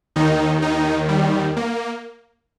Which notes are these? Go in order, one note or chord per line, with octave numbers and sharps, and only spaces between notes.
D#2 D#3 D#4
D#4
G3
A#3